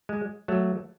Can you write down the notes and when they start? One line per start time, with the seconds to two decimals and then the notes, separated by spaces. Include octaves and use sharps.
0.09 G#3
0.48 F#3 A3